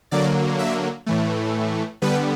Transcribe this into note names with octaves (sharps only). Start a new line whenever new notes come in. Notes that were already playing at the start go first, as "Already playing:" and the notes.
D3 F#3 A#3 D5
E5
A2 E3 A3
D3 G3 B3 B4